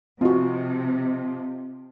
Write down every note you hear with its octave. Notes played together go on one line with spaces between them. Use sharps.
C3 F3 C4 F4 F#4 D#5